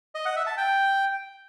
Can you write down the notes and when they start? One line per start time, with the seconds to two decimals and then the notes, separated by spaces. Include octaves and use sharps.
0.15 D#5
0.25 F#5
0.36 E5
0.47 A5
0.57 G5